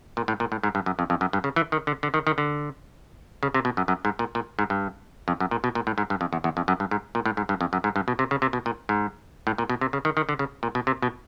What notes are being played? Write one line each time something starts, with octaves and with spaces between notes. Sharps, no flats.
A#2
A2
A#2
A2
G#2
G2
F#2
F2
F2
F#2
G2
C#3
E3
D#3
D3
D3
D#3
D#3
D3
C#3
C3
B2
F#2
F#2
G#2
A#2
A#2
G#2
G2
F2
F#2
A#2
B2
A#2
A2
G#2
G2
F2
E2
E2
F2
F#2
G2
G#2
A#2
A2
G#2
G2
F2
F#2
G#2
G2
B2
C3
C#3
C3
B2
A#2
G#2
A2
A#2
B2
C3
C#3
D#3
D#3
D3
C#3
A#2
B2
C3
B2